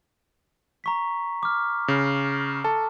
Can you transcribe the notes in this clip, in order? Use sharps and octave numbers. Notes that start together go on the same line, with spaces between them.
A#5 C#6 B6
D6 F6
C#3
A4 A5